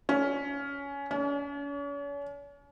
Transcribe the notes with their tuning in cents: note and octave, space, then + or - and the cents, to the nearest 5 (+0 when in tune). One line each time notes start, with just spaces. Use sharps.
C#4 +15
C#4 +40